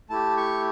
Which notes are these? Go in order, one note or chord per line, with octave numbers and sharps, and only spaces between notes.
A3 E4 G4 A5
C#6